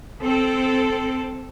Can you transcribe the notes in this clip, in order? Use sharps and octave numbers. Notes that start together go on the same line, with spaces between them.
C4 A4